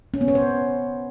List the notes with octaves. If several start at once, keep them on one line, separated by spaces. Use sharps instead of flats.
C#4
B3
C#5
C5